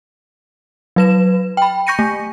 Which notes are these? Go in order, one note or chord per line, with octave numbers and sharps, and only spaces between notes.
F#3 B4 E7
G5 B5
C#6 G6 A#6 C#7 D#7
A3